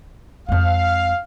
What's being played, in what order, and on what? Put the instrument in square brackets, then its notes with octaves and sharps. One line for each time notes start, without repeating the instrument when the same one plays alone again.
[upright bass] F2 G#3 [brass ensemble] F5